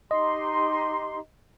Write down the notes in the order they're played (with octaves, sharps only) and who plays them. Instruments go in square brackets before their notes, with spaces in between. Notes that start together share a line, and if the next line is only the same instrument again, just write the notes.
[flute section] D#4 G4 C6 [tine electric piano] D#5